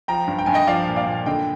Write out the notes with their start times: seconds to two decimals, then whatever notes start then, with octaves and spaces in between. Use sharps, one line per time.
0.08 F3 G5 A#5
0.27 G2
0.39 G5
0.46 G2 G#5
0.54 D#5 G5
0.67 F3 D5 F5
0.87 A#2
0.96 D5 F5
1.07 A#2
1.26 D3 D#5 G5